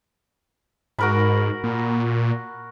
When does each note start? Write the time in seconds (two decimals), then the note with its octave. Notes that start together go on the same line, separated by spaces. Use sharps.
0.99 G#2 F#4 A#4 B5
1.64 A#2